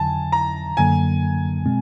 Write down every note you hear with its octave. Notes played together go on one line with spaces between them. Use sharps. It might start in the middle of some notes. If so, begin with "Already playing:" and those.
Already playing: F2 D3 F#3 G#5 A5
A#5
F#2 D3 F#3 A#3 G#5
B2 G#3 C4